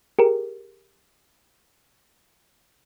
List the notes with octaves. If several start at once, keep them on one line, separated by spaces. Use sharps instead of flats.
G4 G#4 A#4